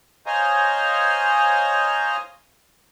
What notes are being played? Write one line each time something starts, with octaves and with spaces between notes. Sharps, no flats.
C5 C#5 D#5 F5 G#5 A#5